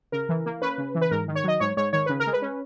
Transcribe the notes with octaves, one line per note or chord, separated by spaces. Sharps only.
C#3 A#4
E3
A#3
C#4 B4
C#3
E3
B4
G#2 A#4
D#3
C#5
F#3 D#5
G#2 C#5
G#2 C#5
D#3 C#5
C#3 B4
A#4
G#3
B4
C#4